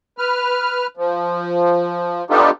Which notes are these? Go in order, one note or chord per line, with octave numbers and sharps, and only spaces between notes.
B4 F6
F3
B3 D4 D#4 F4 G4 A4